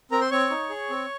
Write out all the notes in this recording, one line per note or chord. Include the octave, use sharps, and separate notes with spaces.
C4 A#4 A#5
C5 C6
C4 C#5 C#6
D#4
G#4
C4